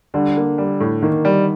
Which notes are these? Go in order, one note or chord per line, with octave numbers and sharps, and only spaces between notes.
D3 G3
A#3
G3
A2
D#3 A#3
G3